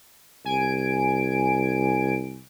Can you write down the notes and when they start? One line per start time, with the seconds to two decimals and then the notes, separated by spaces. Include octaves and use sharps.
0.45 C2 G#5 D7